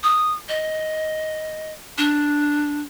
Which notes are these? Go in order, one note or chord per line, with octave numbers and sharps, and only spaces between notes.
D#6
D#5
D4